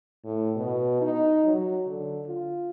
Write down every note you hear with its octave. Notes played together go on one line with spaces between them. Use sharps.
A2
B2
D#4
F#3
D3
F4